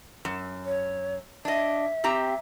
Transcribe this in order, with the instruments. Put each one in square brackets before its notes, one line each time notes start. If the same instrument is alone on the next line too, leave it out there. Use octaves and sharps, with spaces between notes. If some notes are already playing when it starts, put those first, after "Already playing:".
[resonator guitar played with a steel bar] F#2
[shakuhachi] C#5
[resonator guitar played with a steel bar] D4 D#5 [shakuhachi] E5
[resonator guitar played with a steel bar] C4 G4 A#5